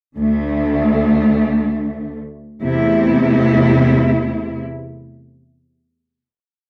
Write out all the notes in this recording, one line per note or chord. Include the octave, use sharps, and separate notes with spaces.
D2 D3 A3
E2 C3 A3 E4